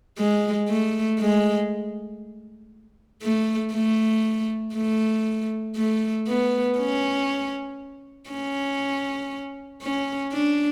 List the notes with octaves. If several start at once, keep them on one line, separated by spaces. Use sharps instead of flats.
G#3
A3
G#3
A3
A3
A3
A3
B3
C#4
C#4
C#4
D4